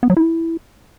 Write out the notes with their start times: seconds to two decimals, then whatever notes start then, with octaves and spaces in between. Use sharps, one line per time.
0.03 B3
0.10 F#3
0.17 E4